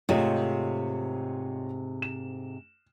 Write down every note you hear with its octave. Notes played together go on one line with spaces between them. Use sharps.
G#2 C3 A3 F4 C#5 D#5
E7